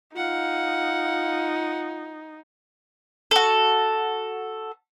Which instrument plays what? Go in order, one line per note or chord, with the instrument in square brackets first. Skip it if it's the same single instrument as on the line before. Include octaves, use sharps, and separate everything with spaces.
[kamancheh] D#4 [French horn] F4 [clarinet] F5 [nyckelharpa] F#5
[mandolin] F#4 A4